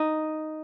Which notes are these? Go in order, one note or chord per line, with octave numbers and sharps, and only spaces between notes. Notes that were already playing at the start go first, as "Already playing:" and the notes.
Already playing: D#4